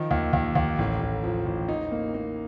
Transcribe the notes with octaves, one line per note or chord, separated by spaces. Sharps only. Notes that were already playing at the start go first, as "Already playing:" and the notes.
Already playing: D#3 F3
D#2
D#2
D#2
A1
A1
F3
A1
D#4
A#3
A#3